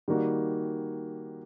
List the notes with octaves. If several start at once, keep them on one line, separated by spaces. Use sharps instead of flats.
D#3 G3 A#3 D#4 F#4